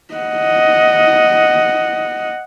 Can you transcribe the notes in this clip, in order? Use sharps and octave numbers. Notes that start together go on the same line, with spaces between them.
D#5 F#5